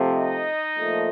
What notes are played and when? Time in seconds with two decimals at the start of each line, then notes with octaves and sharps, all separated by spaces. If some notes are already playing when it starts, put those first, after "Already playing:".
Already playing: C3 F3 A3
0.10 D#4 D#5
0.76 A#2 F3 A3